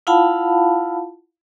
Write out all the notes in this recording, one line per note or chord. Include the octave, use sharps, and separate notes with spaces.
E4 F4 F5 F#5 A5 B5